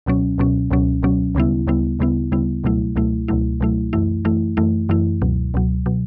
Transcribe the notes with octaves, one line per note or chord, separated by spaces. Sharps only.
C#2 B2 F#3 C#4
C#2 B2 F#3 C#4
C#2 B2 F#3 C#4
C#2 B2 F#3 C#4
D2 C#3 G3 B3 E4
D2 C#3 G3 B3 E4
D2 C#3 G3 B3 E4
D2 C#3 G3 B3 E4
C#2 B2 F#3 A3 E4
C#2 B2 F#3 A3 E4
C#2 B2 F#3 A3 E4
C#2 B2 F#3 A3 E4
F#2 E3 A3 E4
F#2 E3 A3 E4
F#2 E3 A3 E4
F#2 E3 A3 E4
C#2 B2 F#3
C#2 B2 F#3
B2 F#3